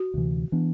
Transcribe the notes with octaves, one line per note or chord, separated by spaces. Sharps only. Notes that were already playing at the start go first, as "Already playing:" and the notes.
Already playing: F#4
D2 C3 E3
E3 B3 D4